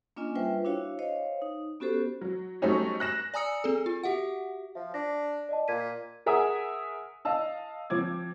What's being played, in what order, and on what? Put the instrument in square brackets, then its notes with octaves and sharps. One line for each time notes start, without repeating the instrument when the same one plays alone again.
[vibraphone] A#3 C#4 D4 F4 D#5 G#5
G3 F4 B4 C5 E5 G5
D4 E4 F#4 C#5 F5
C5 C#5 D#5 F5
D#4
B3 C#4 F#4 G4 A4 C5
[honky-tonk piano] F#3
F#3 G3 A3 C4 C#4 D#4
F#6 A#6 E7
[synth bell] D5 G#5 A#5 D#6 E6 C#7
C4 G#4 A4
F4
F#4 G4 E5 F#5
[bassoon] F3 [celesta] E5
[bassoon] D4 [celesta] A#6
[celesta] D5 D#5 A5
[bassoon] A#2 [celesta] G#6 B6 D#7
[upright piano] G#4 A#4 E5 F#5 G#5 D#6
D#5 F5 A5 E6
F3 C4 D6 G#6